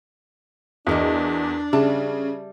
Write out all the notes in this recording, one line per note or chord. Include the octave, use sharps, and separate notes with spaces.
E2 D4 F#4 A#4 D#5
C#3 G3 E5 A5